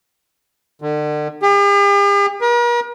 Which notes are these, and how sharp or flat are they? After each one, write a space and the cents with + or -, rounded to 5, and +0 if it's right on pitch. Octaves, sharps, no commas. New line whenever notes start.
D3 +40
G4 +45
A#4 +45